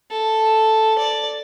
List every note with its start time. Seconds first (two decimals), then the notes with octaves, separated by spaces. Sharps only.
0.11 A4
0.99 D5